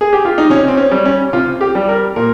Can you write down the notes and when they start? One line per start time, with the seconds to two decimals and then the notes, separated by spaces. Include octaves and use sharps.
0.01 G#4
0.13 G4
0.25 F4
0.38 D#4
0.50 C3 C#4
0.68 C4
0.77 C#4
0.91 G3
1.05 C#4
1.33 C3 F4
1.61 G4
1.75 G3
1.89 A#4
2.16 A#2 A#4